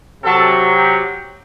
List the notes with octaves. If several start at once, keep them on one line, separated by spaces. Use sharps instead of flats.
C3 F#3 A4
G4